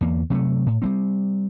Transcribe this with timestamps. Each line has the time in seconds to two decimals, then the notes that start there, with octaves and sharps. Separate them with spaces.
0.01 E2 A#3
0.30 C3 F#3 G#3 A3
0.66 A2
0.82 G3 A#3 C4